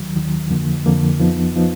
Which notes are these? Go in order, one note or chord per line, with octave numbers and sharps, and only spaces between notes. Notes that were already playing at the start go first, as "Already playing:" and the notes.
Already playing: D#2 D#3 F#3
D#2 D#3 F#3
F2 D3 F3 A#3
F2 D3 F3 A#3
F2 F3 B3 D#4
F3 B3 D#4